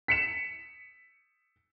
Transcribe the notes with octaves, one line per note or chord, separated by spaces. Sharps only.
B6 C#7 E7